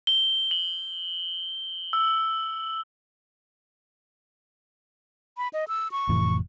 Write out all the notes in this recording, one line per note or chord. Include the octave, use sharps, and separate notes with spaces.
G7
F#7
E6
B5
D#5
E6
C#6
F1 A2 E3